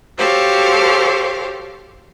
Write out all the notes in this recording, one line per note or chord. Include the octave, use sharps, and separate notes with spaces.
F#4 G4 A4 C5 C#5 F5